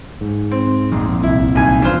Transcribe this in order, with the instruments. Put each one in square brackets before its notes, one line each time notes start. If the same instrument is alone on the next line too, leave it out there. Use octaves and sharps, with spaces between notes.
[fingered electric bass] G#2
[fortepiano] C4
[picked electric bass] A#1 F2
[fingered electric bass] C2 [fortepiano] E4
[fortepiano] B1 D#3 G#5
[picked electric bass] E2 [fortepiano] D4 F4 C5